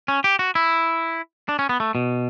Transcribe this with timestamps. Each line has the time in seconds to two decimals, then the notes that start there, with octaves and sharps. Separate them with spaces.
0.08 C#4
0.24 G4
0.39 F#4
0.55 E4
1.49 D4
1.59 C#4
1.69 B3
1.80 A3
1.95 B2